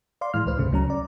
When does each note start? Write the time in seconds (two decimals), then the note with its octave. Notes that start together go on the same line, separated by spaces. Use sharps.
0.21 D5 F5 C6
0.34 A2 E3 G#3 F6
0.46 C#2 B4 C5
0.57 C2 G2 A#2 C#3 A3
0.71 C#2 F#3 C#4 A#5
0.90 D5